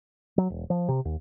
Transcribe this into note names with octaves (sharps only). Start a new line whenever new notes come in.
F#3
E1
F3
C3
D#2